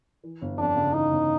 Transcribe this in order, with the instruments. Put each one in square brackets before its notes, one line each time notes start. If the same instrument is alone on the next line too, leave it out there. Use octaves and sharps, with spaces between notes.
[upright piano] E3
G1
[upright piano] F2 [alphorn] D4
[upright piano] C#3
[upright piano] E3 [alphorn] D#4
[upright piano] G1